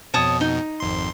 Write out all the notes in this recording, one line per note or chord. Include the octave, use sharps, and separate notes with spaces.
F2 B2 C#5 A5 D#6
D#4
G#1 F2 C6